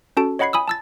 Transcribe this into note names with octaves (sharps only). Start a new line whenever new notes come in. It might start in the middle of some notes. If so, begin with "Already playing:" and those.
C#4 F#4 A4 A5 D7
C#5 D#5 F#5 B5 G#6 C7
G#5 B5 D#6 E6
A5 E6 A6